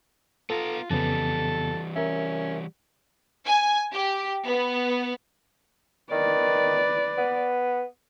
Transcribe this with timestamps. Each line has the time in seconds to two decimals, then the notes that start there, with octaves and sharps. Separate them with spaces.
0.50 B3 F4 A4 A#5
0.90 F2 C#3 E3 G3 B3 A4
1.96 C#4 A#4 E5
3.45 G#5
3.94 G4
4.46 B3
6.12 D#3 B4 D5
7.18 B3